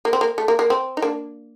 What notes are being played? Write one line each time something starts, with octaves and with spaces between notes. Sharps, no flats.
A#3
C4
A#3
A3
A#3
A#3
C4
D#4
A#3 D4